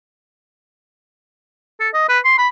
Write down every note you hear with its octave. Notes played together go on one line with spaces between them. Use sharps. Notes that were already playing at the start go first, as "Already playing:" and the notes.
A4
D#5
B4
C6
B5